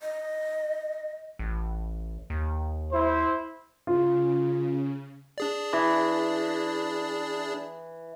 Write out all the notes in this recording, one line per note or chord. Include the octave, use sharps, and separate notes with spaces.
D#5
A1
D#2
E4 C5
C#3 F4
D4 G#4 D5
E3